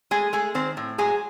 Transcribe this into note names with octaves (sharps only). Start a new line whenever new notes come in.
G#3 A3 G#4
G#3 A3 G#4
D#3 C4 C5
A2
F#3 G#3 G#4